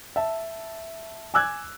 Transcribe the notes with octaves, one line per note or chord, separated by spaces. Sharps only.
E5 A5
G#5 D6 E6 F#6 G#6